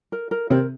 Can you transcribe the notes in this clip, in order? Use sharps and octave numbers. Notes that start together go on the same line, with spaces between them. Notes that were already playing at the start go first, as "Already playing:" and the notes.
A#4
A#4
C3 C4 A#4